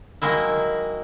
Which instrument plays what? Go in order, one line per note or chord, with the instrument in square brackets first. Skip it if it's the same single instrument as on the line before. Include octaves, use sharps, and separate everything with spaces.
[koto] D#3 F#3 G#3 A#3 E4